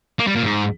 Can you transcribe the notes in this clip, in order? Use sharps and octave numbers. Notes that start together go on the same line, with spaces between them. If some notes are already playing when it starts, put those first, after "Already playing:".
A#3
G3
A#2
G#2